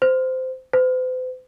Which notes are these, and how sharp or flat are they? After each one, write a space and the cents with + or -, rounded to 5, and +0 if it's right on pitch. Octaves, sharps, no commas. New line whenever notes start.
C5 -15
C5 -45